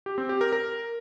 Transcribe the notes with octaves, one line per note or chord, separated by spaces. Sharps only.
G4
C4
G4
A#4
A#4